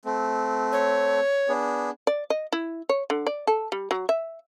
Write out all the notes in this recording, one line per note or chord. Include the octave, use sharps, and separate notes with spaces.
A3 C4
C#5
B3 D4 G#4
D5
D#5
E4
C#5
D3
D5
A4
G3
F#3
E5